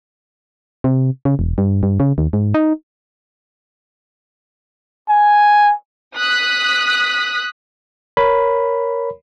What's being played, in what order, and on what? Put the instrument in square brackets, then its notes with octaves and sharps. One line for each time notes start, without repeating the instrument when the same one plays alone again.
[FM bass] C3
C#3
E1
G2
G2
C#3
D#2
G#2
D#4
[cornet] G#5
[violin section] D#6 F#6 B6
[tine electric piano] A#4 C#5 B5